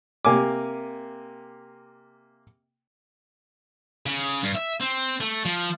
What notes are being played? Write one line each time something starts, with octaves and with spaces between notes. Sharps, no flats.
C3 A#3 G#5 D6
C#3
G2
E5
C4
A3
F3